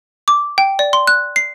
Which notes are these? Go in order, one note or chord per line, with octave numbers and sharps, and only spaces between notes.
D6
G5
D5
C6
F#6
C7